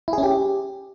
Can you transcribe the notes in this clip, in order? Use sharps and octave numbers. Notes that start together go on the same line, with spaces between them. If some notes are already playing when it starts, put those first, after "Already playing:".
E4
G#4
C#4
G4